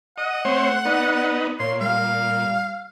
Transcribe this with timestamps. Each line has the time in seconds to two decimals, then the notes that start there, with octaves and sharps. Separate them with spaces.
0.18 D#5 F#5
0.45 A3 C4 C5 C#5
0.85 B3 D#4 D5
1.60 A#2 C#5 C6
1.81 G3 F5